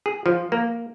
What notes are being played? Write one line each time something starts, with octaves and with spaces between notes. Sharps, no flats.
G#4
F3
A#3